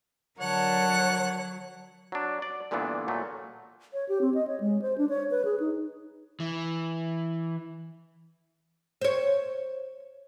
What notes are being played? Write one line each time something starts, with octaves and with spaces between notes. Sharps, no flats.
D3 F#3 A#4 C#5 F#5 A5
F#3 D4
D5
G2 A#2 D3 E3 B3 D4
A#2 F#3 A3
C#5
G4
C4
D#5
C#5
G#3
C5
D4
C#5
B4
G#4
D#4
E3
C5 C#5